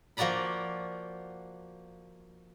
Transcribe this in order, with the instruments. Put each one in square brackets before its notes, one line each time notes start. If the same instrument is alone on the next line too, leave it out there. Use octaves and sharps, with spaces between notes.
[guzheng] F3 A#3 F#4 D5 A#5 B5